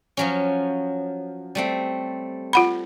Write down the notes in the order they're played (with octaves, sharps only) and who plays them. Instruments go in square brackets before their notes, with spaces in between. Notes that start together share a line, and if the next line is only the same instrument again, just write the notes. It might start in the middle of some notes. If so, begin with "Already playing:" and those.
[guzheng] F3 F#3 C#4
G3 A3 C4
[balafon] F4 F#5 B5